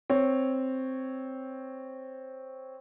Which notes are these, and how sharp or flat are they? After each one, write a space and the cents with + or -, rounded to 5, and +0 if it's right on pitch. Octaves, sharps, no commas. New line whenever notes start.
C4 +0 C#5 +0